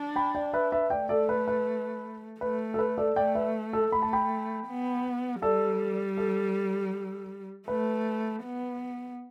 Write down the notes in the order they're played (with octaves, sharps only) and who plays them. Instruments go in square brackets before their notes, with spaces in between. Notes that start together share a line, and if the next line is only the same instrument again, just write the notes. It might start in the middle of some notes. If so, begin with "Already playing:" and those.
Already playing: [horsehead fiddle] D4
[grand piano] G5 B5
D5 G5
B4 E5
B4 E5
[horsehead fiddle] A3 [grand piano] D5 G5
[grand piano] A4 D5
B4
B4
[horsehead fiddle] A3 [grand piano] B4
[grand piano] A4
B4
A4 D5
[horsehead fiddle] A3 [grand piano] D5 G5
[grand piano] B4 E5
A4
[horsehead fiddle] A3 [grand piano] B5
[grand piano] A5
G5 B5
[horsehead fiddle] B3
[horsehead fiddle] G3 [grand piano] A4 D5
[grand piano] A4
[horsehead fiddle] A3 [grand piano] B4
[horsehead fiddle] B3